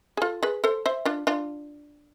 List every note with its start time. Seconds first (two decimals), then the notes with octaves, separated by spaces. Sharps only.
0.17 G#4
0.22 F4 A4
0.43 G#4 B4
0.64 A4 C5
0.86 C5 E5
1.05 D4 F4
1.27 D4 F4